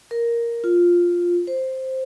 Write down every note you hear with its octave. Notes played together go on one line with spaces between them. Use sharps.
A#4
F4
C5